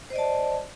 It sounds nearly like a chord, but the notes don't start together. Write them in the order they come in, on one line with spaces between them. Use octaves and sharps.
C5 D#5 D5 A5